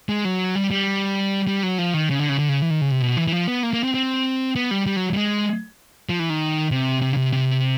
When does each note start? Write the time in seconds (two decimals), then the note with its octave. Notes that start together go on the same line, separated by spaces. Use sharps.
0.09 G#3
0.25 F#3
0.55 G3
0.71 G3
1.47 G3
1.63 F#3
1.78 F3
1.94 D#3
2.10 C#3
2.19 D3
2.29 C#3
2.39 D3
2.49 C#3
2.62 E3
2.70 D#3
2.81 C#3
2.91 C3
3.01 B2
3.17 E3
3.28 E3
3.32 F3
3.48 B3
3.63 A#3
3.73 A#3
3.84 C4
3.94 C4
4.56 B3
4.71 G3
4.86 G3
4.96 F#3
5.13 G3
5.17 G#3
6.09 F3
6.19 E3
6.30 D#3
6.71 C3
7.02 C3
7.13 C#3
7.17 C3
7.32 C3